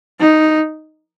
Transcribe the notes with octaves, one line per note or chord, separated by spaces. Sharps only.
D#4